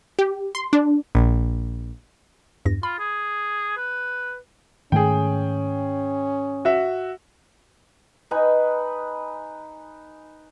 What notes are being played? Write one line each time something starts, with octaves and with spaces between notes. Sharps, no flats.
G4
C6
D4
A#1
E2 G2 A#6
F4 B5
G#4
B4
G#2 D#3 A3 C#4 G#4 G5
F#4 E5
D#4 B4 G#5